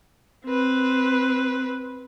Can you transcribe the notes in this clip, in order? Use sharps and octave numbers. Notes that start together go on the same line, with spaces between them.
C4 B4